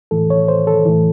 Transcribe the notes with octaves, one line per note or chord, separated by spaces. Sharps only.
A2 E3 A4
C#5
C5
A4
A2 E3